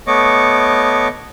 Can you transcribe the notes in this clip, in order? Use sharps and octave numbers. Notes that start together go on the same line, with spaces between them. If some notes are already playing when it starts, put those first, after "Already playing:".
A3 B3 C#5 D#5 C#6 D6